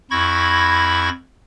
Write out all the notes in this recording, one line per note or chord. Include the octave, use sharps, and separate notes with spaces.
F2 E4 B5 C#6 G#6 A#6